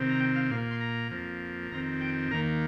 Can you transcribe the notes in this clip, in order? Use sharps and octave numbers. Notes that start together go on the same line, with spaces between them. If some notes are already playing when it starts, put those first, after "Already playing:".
Already playing: C3 D#3 C4
A#5
G5
F5
A#2 A#3 F5
C6
A#5
F2 F3 A#3
F2 D#3 C4 A#5
G5
D#2 D#3 A#3 A#5